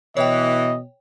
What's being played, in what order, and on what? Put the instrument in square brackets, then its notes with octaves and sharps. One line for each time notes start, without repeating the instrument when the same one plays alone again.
[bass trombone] B2 [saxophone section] E3 [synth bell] C#5 G5 [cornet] D#5